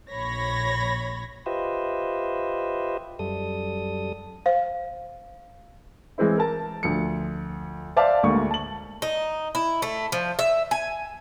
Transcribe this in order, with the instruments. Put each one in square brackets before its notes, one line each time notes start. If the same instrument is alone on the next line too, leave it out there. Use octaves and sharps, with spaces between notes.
[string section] A#1 C#5 B5 G#6 A#6
[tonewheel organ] F4 G4 B4 C5 D#5 E5
F#2 G3 A4 D#6
[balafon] C5 [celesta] F5
[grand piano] E3 G#3 C4 E4
A#4 A5
D2 F3 C#7
C5 D5 E5 F5 A5
D2 G#2 A#3 C#6
A5 F#7
[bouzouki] D#4
E4
A3
F3
E5
G#5